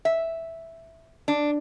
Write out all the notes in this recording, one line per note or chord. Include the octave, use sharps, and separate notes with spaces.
E5
D4